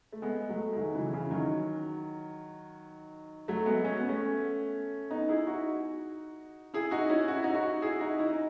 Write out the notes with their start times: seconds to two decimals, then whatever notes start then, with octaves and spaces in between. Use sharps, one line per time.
0.13 A3
0.22 G#3 B3
0.50 F#3 A3
0.73 G#3
0.76 D#3 F#3
0.94 C#3 E3
1.12 C#3 E3
1.31 D#3 F#3
3.48 F#3 A3
3.66 G#3 B3
3.85 C#4
3.97 B3
4.09 A3 C#4
5.10 B3 D#4
5.29 E4 G#4
5.47 D#4 F#4
6.74 E4 G#4
6.91 D#4 F#4
7.09 C#4 E4
7.28 F#4
7.36 E4
7.43 D#4 F#4
7.55 D#4 F#4
7.82 E4 G#4
8.00 D#4 F#4
8.19 E4
8.29 D#4